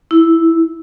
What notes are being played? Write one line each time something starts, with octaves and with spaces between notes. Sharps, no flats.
E4